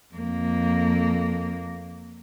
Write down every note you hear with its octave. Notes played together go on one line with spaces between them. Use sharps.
F2 A#3